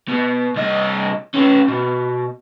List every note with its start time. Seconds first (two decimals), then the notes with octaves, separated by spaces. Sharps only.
0.08 B2
0.56 C2 D#5
1.35 C#4 B4
1.68 B2